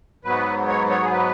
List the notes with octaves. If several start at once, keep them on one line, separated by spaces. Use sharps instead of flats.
G#2 F#3 B3 B4
C#5
C#5
G#4
B4